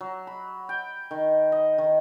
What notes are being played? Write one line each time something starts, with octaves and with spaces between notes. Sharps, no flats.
F#3
B5
G5
D#3
D#5
D#3